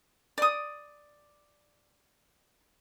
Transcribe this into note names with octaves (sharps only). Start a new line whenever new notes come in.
D5 D#6